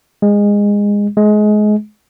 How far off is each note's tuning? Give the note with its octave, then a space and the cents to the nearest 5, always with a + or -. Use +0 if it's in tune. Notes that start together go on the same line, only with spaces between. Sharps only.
G#3 -20
G#3 +25